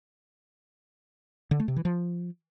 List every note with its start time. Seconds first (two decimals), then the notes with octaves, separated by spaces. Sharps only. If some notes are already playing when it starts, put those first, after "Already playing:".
1.51 D3
1.60 A3
1.68 C3
1.76 E3
1.85 F3